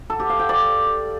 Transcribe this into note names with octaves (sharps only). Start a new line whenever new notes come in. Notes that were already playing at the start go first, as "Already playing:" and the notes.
A4
G4
F5
G5
D5